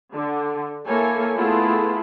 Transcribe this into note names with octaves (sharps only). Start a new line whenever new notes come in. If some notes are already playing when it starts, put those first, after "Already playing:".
D3
A#3 E4 A4 C#5 G#5
A3 B3 E4 F4 G#4 A4